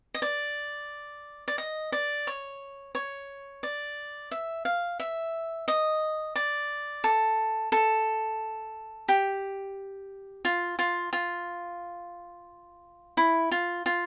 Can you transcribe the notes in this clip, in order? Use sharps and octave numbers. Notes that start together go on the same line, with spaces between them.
D#5
D5
D5
D#5
D5
C#5
C#5
D5
E5
F5
E5
D#5
D5
A4
A4
G4
F4
F4
F4
E4
F4
F4